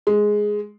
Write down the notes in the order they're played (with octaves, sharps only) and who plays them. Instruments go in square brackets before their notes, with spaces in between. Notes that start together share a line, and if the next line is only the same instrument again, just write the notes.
[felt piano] G#3